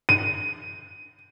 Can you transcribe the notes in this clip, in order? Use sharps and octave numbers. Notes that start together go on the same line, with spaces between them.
D#7